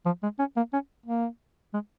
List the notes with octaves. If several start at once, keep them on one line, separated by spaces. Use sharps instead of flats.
F3
G#3
C#4
A#3
C#4
A#3
G#3